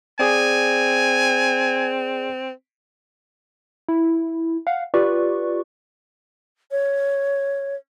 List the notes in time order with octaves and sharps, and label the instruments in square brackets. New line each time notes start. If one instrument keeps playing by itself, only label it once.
[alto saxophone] C4 [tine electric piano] G#4 D5 [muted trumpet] G#5
[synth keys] E4
F5 F#5
F4 G4 B4 D5 C#6
[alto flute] C#5